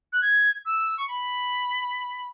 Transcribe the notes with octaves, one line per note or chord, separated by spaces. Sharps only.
F#6
G#6
E6
C#6
B5